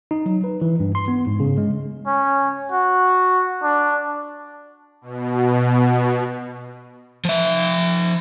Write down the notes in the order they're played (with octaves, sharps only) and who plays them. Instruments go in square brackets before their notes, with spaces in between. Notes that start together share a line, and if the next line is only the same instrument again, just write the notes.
[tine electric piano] D#4
F#3
B4
E3
G2
C6
B3
G#2
C#3
G#3
[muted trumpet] C#4
F#4
D4
[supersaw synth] B2
[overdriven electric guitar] F3 E5